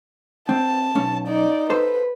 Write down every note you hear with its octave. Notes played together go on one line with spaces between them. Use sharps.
C4 A5
B1 C#4
D#4 D5
A4 B4 C5